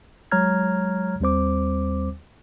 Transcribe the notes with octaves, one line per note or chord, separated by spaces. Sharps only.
F#3 G#3 C#5 A#5 F6 G#6
D#2 G3 C4 C5 D6